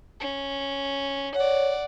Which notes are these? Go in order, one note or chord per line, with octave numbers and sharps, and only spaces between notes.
C#4
C#5 D5 F#5